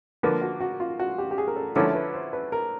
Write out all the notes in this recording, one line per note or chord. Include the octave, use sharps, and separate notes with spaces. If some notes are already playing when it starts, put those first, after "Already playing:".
D3 F3 A#3 B4
F#4
F#4
F4
F#4
G4
G4
G#4
A#4
A4
D3 F3 A3 C#4 E4 A#4
B4
C5
B4
A#4